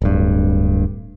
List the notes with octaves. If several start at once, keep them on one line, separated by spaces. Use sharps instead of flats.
D1 G2